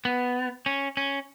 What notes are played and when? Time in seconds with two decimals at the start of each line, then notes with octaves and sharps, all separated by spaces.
0.05 B3
0.66 C#4
0.97 C#4